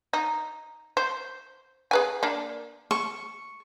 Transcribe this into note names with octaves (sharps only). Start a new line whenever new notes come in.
D#4
C5
G#4 B4 G#5
A#3 D4
C#6